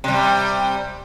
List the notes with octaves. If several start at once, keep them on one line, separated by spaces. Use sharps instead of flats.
C3 G3